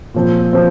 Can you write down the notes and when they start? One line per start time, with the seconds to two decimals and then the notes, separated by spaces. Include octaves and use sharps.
0.14 A#2 F3 C4
0.53 F3 C4